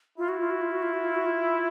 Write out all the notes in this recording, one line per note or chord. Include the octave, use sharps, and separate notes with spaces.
E4 F4
F#4
F4
F#4
F4
F#4
F4
F#4
F4
F#4
F4